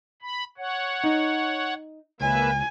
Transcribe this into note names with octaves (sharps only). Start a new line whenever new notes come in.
B5
C#5 F#5
D#4
C#2 A#3 B4 E5 G#5